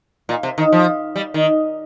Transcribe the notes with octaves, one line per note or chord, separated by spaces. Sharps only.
A#2
C3
D#3
F3
G3
D#3